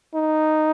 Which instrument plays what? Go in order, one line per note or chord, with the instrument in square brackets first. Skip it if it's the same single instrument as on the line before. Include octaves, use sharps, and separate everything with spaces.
[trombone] D#4